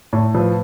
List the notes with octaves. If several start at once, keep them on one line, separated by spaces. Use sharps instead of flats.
A2
F3 B4